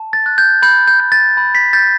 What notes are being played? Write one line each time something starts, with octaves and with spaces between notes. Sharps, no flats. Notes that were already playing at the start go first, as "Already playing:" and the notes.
Already playing: A5
A6
F#6
G6
B5 G6
G6
G6
A6
B5
B6
G6 A6